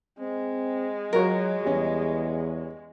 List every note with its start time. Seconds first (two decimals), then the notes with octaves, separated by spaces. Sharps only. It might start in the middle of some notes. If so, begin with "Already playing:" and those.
0.20 G#3 C4
1.13 F#3 F4 F#4 A#4 C#5
1.65 E2 G3 C#4 D#5